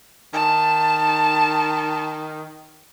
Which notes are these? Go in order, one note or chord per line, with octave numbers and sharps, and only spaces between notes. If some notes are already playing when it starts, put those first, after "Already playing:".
D#3 A5